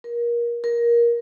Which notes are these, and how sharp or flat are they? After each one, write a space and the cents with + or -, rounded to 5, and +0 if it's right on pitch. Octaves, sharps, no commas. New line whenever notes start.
A#4 +25
A#4 +15